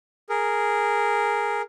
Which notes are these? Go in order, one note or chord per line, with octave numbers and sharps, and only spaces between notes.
G#4 A#4